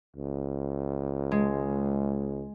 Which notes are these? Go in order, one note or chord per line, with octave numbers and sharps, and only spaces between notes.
C#2
G#3